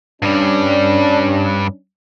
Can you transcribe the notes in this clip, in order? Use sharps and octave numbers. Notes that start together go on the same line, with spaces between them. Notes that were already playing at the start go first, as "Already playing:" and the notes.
G2 G3 C#4 D4